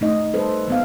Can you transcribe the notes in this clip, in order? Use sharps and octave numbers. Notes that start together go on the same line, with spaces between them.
A3 D#4 D#5
G3 A4 B4 C5
F3 B3 F5